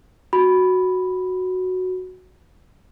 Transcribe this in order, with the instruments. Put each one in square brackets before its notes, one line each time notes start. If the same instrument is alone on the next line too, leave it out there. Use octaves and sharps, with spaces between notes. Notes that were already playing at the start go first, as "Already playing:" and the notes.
[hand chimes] F#4 [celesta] B5